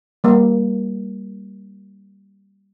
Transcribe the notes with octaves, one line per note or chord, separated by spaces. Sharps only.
G3 A#3